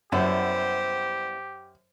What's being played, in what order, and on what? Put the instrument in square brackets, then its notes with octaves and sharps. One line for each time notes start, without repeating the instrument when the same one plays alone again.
[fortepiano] F#2 [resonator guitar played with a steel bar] G3 B3 E4 [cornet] G4 [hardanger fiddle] C5